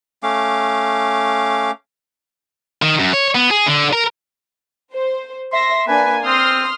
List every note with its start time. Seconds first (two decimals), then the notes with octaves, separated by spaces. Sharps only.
0.23 A3 C#4 F5 D6
2.82 D#3
3.00 F#2
3.13 C#5
3.35 B3
3.51 G#4
3.66 D3
3.93 A#4
4.93 C5
5.52 E5 C6 A#6
5.87 A#3 D4 B4 G#5
6.24 C4 C6 D#6 F6